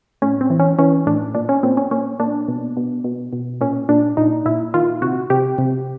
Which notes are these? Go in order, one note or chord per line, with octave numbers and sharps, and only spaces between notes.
A2 C#4
C4
E3
C#4
E3 C#4
A2 D4
A#2 D4
C#4
A#2 C4
C#4
A#2 C#4
A#2 D4
B2
B2
B2
B2
A#2 C#4
A#2 D4
A#2 D#4
A#2 E4
D#3 F4
C3 F#4
C3 G4
C3